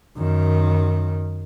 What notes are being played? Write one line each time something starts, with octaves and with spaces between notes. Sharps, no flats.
F#2 D#3